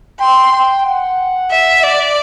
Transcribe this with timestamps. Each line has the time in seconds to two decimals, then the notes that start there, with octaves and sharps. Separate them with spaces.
0.20 G5 C6
0.53 G5
0.86 F#5
1.51 E5
1.83 D5